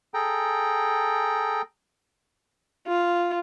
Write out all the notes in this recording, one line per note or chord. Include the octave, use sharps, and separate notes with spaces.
G#4 A4 G5 A#5
F4